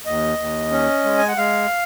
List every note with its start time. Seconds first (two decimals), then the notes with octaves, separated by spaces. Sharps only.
0.06 D#2 D#5
0.38 D#2
0.71 C#4
1.05 G#3
1.18 G#5
1.28 F#5
1.37 G#3 F5